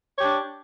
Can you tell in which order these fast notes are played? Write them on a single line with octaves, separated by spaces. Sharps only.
C#5 G4 D4